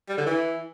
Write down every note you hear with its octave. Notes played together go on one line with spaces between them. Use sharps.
G3
D3
E3